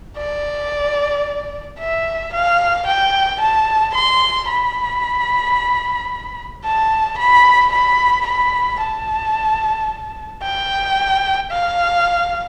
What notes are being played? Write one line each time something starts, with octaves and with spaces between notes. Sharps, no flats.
D5
E5
F5
G5
A5
C6
B5
A5
B5
B5
B5
A5
G5
F5